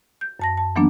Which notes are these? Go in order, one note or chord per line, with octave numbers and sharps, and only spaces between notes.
G6
F#2 A5 A#6
A5
E3 F#3 A#3 B3 D4